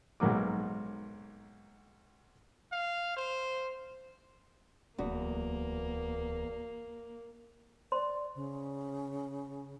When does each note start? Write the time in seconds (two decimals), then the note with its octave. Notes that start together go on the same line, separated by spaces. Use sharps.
0.20 B1 G#2 F#3 A#3 D6
2.72 F5
3.17 C5
4.98 D1 E2 A#3 F#4 B4
7.92 C5 D5 C6
8.35 C#3